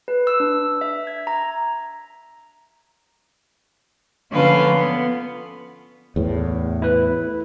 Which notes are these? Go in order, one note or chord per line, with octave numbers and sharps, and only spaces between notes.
B4
E6
D4
E5
G#6
A#5
D3 F3 A#3 C#4 F4 B4
B3
E2 A2
E4 B4